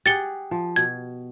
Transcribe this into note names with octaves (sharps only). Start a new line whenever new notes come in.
G4 G#4 F#5 A6 C#7 G7
F3
B2 G#6